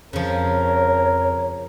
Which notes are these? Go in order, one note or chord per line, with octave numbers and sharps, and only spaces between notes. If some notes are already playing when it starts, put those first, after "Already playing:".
F2 C#3 F3 A#4 C#5